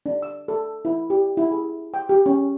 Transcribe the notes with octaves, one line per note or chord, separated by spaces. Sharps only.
D4
E6
A4
E4
G4
E4
G#4
G5
G4
C#4